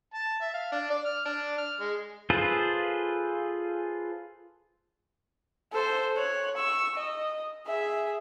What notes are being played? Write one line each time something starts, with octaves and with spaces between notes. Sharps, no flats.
A5
E5
F5
D4
D5
F6
D4
F6
G#3
F4 G#4 A4 B4 C5
A4 C5
C#5 F#6
C#6 E6
D#5
G#4 E5